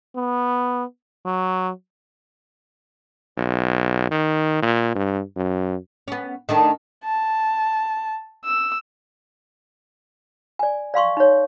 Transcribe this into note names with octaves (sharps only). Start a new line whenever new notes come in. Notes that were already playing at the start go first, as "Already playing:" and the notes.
B3
F#3
B1
D#3
A#2
G2
F#2
B3 C#4
D#3 A3 D4
A5
E6
D5 G#5
D5 F5 C6 C#6
D#4 C#5